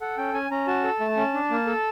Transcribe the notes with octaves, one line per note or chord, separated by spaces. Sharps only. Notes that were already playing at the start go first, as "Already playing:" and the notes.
A4 F#5
C#4 G5
C#4 G#5
C#4 A#5
F#4 A5
A4
A3
C#4
D4
A#3
A4